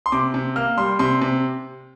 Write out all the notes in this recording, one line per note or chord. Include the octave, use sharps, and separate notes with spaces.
C6
C3 D6
C3
A#3 F6
G3 C6
C3 C6
C3